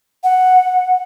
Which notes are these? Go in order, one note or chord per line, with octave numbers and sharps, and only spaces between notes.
F#5